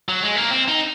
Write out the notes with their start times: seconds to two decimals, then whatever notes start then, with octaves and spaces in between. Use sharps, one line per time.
0.09 F#3
0.23 G#3
0.36 A#3
0.51 C4
0.68 D#4